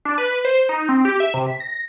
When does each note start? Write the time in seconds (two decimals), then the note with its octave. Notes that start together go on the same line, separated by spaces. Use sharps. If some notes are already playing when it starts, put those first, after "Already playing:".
0.05 D4
0.18 B4
0.45 C5
0.69 D#4
0.89 C4
1.05 G4
1.20 E5
1.34 C3
1.47 B6
1.60 A#6